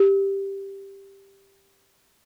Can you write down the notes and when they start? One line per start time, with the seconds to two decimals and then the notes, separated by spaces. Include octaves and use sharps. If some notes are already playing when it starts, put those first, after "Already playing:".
Already playing: G4